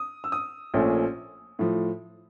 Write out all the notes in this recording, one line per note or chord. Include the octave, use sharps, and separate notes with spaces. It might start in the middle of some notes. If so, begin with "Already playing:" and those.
Already playing: D#6
E6
D#6
A#1 A#2 F3 A3 C#4
A2 F3